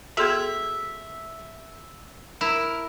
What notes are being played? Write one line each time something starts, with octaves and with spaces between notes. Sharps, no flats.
B3 F#4 G#4 A4 E5 C6 G#6
E4 A#4